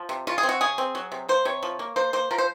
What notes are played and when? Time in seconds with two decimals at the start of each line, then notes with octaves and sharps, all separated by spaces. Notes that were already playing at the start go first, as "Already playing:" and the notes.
Already playing: F3
0.09 C3
0.27 C#3 F4
0.38 G#4
0.43 C4
0.49 F#4
0.61 C#3 G#4
0.78 C4
0.95 F#3
1.12 C3
1.29 A#3 C5
1.45 C3 C#5
1.63 F3
1.79 A#3
1.96 A#3 C5
2.13 A#3 C5
2.31 F3 A#4
2.38 C5